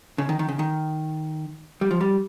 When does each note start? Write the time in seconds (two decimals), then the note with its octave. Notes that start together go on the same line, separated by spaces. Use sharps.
0.18 C#3
0.29 D#3
0.39 D#3
0.49 C#3
0.59 D#3
1.81 G3
1.91 F3
2.01 G3